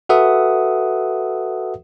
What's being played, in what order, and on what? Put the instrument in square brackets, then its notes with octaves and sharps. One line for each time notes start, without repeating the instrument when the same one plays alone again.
[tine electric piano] F#4 A4 B4 E5 F#5 D#6